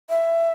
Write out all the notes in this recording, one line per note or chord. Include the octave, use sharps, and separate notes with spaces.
E5